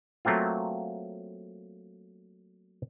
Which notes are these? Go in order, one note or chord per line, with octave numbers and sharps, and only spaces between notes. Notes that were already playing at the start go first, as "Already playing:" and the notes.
F#3 A3 A#3 C4 F4